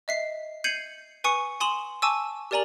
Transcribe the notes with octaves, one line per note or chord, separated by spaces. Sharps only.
D#5 E5 C7
G6 G#6 C7 C#7 D#7 F#7
B4 G#5 C#6 D#6 C#7
G#5 C6 D#6 E7 F#7
G#5 A5 C#6 D6 E6
G4 A#4 D5 G#5 A#5 F#7